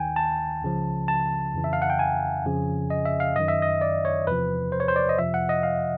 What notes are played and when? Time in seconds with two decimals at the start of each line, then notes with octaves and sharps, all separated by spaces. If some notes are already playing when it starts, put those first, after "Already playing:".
Already playing: D#2 D#3 G5 G#5
0.16 A5
0.62 C#2 C#3 F3
1.08 A5
1.54 F2 C#3 E3
1.64 E5
1.73 F5
1.82 F#5
1.90 G5
1.99 G#5
2.45 F2 C#3 F3
2.90 D#5
3.05 E5
3.20 F5
3.36 F#2 D#3 D#5
3.48 E5
3.62 D#5
3.81 D5
4.05 C#5
4.27 E2 C3 F3 B4
4.72 C5
4.80 C#5
4.88 C5
4.96 D5
5.09 D#5
5.18 F2 C3 F3 E5
5.34 F#5
5.49 D#5
5.63 F5